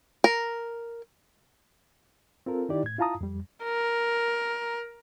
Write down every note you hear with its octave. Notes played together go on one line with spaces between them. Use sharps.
A#4
C4 F4 A4 A#4
D#3 D#4 E4 G4 D5
A2 G#6
E4 F4 F5 A5 A#5 D#6
F2 G3
A#4